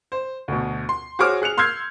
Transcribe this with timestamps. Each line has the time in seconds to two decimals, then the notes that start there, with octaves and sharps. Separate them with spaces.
0.12 C5
0.48 D2 B2
0.89 C6
1.19 F#4 G#4 C5 C#5 D6 F6
1.42 G#4 F#6 C#7 F7
1.58 C6 E6 F6 G6 G#6 C7